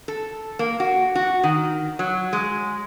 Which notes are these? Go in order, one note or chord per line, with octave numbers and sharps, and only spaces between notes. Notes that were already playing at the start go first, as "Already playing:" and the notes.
A4
A#3
F#4
F#4
D#3
F#3
G#3